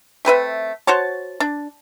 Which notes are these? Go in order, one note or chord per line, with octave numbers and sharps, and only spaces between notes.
A3 C4 B4 E5
F#4 C5 C#5 A5
D4